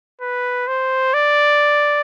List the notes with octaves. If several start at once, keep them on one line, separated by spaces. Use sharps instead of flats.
B4
C5
D5